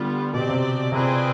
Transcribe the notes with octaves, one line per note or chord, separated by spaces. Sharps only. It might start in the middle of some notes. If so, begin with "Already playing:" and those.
Already playing: D3 G3 B3 F4
B2 C4 G4 D5
C3
C3 C4 F4 G#4 B4 D5